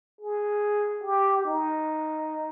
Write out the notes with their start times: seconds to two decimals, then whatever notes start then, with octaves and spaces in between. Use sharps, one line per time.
0.21 G#4
1.04 G4
1.45 D#4